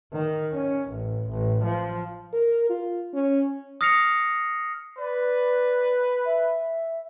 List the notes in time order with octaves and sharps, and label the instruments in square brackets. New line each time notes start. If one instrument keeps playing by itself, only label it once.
[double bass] D#3
C#4
A1
A1
F3
[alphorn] A#4
F4
C#4
[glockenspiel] D#6 F6 A#6 C7 C#7 F7
[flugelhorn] B4 [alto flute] D5
[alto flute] E5